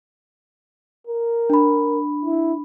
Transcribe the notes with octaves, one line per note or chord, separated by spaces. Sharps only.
A#4
D4 B5
E4